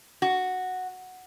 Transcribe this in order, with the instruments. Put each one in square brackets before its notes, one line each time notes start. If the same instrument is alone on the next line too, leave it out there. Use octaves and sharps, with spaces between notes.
[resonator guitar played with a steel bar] F#4